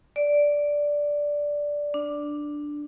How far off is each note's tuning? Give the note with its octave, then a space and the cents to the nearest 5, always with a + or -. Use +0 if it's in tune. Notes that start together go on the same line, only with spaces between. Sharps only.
D5 -5
D4 +5